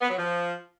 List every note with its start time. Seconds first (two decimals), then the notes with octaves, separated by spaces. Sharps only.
0.01 B3
0.09 F#3
0.18 F3